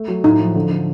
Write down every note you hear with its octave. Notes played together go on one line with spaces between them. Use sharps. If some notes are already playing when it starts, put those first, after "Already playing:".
Already playing: A3
F#3
A2 D#4
F3
D3
D3